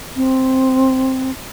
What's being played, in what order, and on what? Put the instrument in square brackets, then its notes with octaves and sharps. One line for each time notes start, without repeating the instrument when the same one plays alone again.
[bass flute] C4